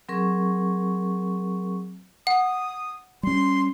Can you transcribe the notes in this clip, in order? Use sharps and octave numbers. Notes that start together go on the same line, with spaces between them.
F#3 C4 G#4 A#4 C#6
F#5 D#6
G3 C#4 C6